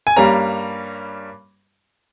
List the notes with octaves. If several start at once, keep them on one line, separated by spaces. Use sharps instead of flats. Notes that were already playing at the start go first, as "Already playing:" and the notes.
G#5
G2 G3 A#3 C#4 A#5